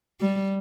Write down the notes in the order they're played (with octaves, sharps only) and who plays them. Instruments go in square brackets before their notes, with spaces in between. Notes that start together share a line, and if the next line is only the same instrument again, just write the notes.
[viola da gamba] G3